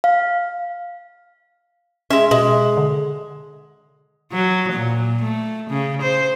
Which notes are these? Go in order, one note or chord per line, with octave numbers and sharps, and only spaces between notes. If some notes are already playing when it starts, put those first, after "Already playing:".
F5
G#3 C#4 E5
B2 G#3
D3
F#3
A#2
A3
C#3
C5